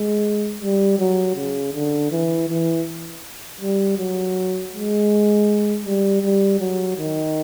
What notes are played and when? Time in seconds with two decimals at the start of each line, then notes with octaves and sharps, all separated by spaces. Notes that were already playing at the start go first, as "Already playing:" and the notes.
Already playing: G#3
0.62 G3
0.99 F#3
1.36 C#3
1.74 D3
2.11 E3
2.49 E3
3.61 G3
3.98 F#3
4.73 G#3
5.85 G3
6.23 G3
6.60 F#3
6.97 D#3